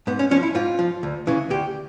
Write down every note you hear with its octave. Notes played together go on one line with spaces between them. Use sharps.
G#2 B3
C#4
F3 C#4
E4
G#2 F4
F3
D2
C#3 E3
D2 G4